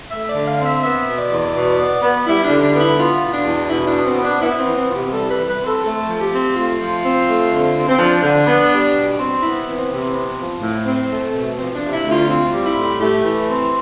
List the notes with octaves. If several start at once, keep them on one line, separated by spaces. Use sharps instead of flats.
A3 E5
D5
D3
F5
C4 F5
E5
B3 E5
B2
D5
E2
B2
B3
B3
G3 E4
D4
D3
D4
B3
E4
B3 F4
B2
D4
E2
B2 E4
D4
B3
C4
B3
D4
B3 E4
C4
E3
C4
C3 F4
G4
G3 A4
B4
E3
B4
C4
A4
A3 A4
F3
G4
C4
A3 F4
F3
C4
A3
D3
C4
C4
F3 D4
D3
B3
G3
B2
C4
B3 E4
E3
C4
C3
B3
F3
A2
C4
A3
B2
F3 C4
D4
C3
E4
D2
F4
C4 F4
G3
E4
A2
A3 G4
E3
C4